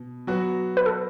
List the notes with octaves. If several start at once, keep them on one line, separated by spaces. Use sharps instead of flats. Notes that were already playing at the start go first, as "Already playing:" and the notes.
Already playing: B2
F#3 B3 F#4
B4
A4